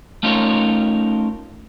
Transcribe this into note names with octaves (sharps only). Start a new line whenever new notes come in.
A3 C#4 D#4 F4 A#4 C#5